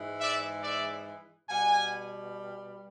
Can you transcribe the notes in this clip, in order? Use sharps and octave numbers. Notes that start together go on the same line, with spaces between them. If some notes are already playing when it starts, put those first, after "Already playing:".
Already playing: G#2 E3 G#3
D5 E5
D5 E5
B2 G3 F#5 G#5